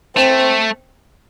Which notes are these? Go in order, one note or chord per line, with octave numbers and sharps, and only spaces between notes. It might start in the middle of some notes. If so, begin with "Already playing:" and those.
A3 C4